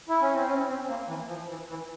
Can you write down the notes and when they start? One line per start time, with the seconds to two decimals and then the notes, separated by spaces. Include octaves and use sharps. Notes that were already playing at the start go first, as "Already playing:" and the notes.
0.09 E4
0.22 C#4
0.35 C4
0.48 C#4
0.69 C4
0.89 A#3
1.09 E3
1.29 F3
1.49 E3
1.69 E3